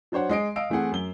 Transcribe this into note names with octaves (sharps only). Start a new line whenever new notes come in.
F#3 D4 C5 C#5 F#5
G#3 D#5 C7 D7
D#5 F5 E6 D7
E3 A3 C4 G#4 F#5
F#2 G7